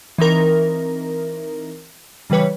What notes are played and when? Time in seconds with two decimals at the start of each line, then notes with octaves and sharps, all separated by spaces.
0.18 E3 C4 D#4 A#4
2.30 C#3 E3 G3 B4 C#5